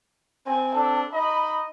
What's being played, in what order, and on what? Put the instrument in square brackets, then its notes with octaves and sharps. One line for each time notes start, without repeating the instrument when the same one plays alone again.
[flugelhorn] C4 [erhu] G#5
[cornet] D4 [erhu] A4
[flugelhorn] D#4 [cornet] D#5 [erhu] B5